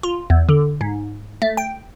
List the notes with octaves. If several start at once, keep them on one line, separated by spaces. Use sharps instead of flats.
F4
E2
D3
G#2
A3
G5